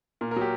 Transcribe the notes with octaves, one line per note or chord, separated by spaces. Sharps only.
A#2 A#4
A#4
F#3 G4